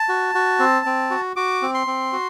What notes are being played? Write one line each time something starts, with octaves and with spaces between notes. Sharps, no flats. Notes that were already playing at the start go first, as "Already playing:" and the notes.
Already playing: A5
F#4
F#4
C4
C4
F#4
F#4 D6
C4
C6
C4
F#4